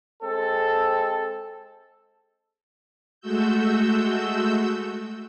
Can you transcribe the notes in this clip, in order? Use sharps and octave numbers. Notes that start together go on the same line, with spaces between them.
G#3 C4 A4
G#3 A3 F#4 E6 G6